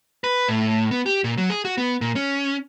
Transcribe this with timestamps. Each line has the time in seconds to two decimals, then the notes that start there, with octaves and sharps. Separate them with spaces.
0.24 B4
0.49 A2
0.91 B3
1.06 G4
1.24 A#2
1.38 F#3
1.50 G#4
1.65 F#4
1.78 B3
2.01 A#2
2.16 C#4